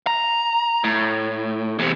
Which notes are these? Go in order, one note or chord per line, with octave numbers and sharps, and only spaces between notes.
A#5
A2
E2 C3